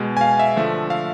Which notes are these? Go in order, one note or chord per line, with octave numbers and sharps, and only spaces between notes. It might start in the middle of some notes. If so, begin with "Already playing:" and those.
Already playing: B2 G#3
G#5
F5
E5
D3 F3 A3
F5